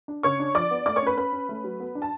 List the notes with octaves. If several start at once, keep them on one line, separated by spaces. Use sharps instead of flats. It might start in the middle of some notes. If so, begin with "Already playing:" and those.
D4
C#3 C#5 C#6
D4
F3 D5 D6
B3
A3 D5 D6
C#5 C#6
C#4 B4 B5
C#4 B4 B5
C#4
A3
F#3
B3
D4
A5